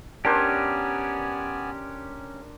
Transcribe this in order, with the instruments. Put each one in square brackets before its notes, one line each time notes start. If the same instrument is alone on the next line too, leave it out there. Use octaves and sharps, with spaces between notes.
[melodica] B3 D5 G#5 [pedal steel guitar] C#4 G4 [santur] D4 A#4 C5